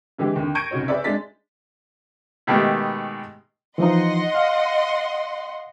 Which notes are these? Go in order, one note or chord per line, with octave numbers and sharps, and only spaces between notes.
D3 E3 G#3 G4
D#2 D3
C#6 G6 G#6 A#6 D7 D#7
C2 C#3 D#4 F#4 C#5
G#4 B4 C#5 D5 E5
G#3 D4 A6 B6
B2 D#3 G#3 A3 B3 G4
E3 F3 D#4 D#5 F#5 C6
F5